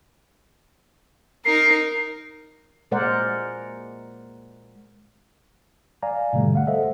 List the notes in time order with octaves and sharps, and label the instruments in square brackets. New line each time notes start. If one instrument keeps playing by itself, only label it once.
[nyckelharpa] D#4 A#4 [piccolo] C7
[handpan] A#2 G#3 A#4 C5 D5 F#5
[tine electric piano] D5 F5 G#5 A#5
G#2 B2 D3 G3 A3
F5 F#5
A4 C5 D#5 E5 F#5